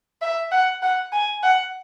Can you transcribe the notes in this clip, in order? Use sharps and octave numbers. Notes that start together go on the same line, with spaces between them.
E5
F#5
F#5
G#5
F#5